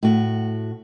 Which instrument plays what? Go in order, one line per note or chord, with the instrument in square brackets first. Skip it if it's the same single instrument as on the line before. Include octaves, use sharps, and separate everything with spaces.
[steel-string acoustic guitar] A2 F#4